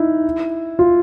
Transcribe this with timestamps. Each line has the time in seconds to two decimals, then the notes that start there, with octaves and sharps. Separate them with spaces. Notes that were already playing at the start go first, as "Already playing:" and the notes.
Already playing: D#4 E4
0.79 F4